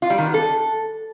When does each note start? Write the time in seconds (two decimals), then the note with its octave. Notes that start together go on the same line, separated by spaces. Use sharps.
0.02 F4
0.10 G3
0.18 D#3
0.26 B3
0.34 A4